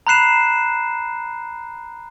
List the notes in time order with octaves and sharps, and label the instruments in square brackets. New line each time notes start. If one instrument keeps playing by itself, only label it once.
[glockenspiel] A#5 B5 F#6 C7 E7